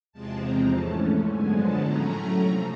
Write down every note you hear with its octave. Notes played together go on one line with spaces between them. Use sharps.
E2 C3 F3 G#3 C4 A5
A#5
G#2 E3 A3 C#4 A5
F#2 D3 F3 G#3 B3 G#5
A5
A2 F#3 A3 C#4 A#5
C3 F3 A3